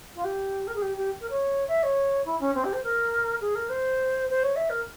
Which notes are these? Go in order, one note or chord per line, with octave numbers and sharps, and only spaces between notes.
F4
G4
A#4
G#4
G4
G4
A#4
C#5
E5
C#5
E4
C#4
C4
G4
C5
A#4
G#4
A#4
C5
C5
C#5
E5
A#4